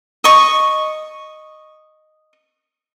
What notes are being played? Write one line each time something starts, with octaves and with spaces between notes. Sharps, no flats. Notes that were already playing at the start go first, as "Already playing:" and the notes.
D#5 C#6